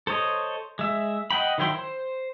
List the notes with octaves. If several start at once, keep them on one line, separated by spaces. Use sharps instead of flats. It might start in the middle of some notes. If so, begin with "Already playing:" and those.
A4 C5 C#5 D#5
G#3 E5
D#5 F#5 G5 B5
D#3 F#3 E4 G5 C6
C5